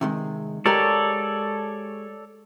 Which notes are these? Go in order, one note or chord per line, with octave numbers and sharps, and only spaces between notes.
C3 D#3 G#3
G#3 G4 A4 A#4 C#5 D5